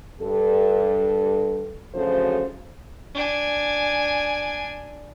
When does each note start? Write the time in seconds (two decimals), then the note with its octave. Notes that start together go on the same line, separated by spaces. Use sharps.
0.21 G2 A4
1.94 D2 C#3 F3 F#3 A4 C5
3.14 D4 G#5